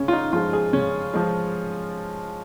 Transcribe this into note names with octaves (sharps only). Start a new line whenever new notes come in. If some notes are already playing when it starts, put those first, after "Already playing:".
Already playing: C#3 C#4
F4
D#4
F3 G#3 F4
G#4
C#3 C#4
F3 G#3